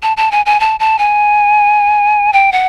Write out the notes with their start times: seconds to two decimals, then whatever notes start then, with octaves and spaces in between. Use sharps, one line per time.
0.03 A5
0.17 A5
0.31 G#5
0.46 G#5
0.60 A5
0.80 A5
0.99 G#5
2.33 G5
2.52 F#5